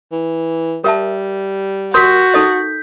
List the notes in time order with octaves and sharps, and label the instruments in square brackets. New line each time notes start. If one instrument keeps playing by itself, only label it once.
[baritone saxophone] E3
[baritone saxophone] G3 [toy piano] A#4 E5 A5
[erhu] F#4 [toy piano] A#4 C6 [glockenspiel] G6 B6
[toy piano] D#4 A4 D#5